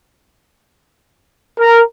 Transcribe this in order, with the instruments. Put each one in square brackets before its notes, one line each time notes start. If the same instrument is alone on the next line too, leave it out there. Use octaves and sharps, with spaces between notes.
[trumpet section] A#4